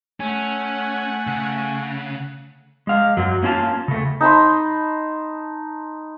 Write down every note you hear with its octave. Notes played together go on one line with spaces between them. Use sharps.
A3 C#4 F#5 G#5
C#3
G#3 F5
F#2 F#3
A#3 C#4 F4 A5
C#3 A3
D#4 A5 B5 C6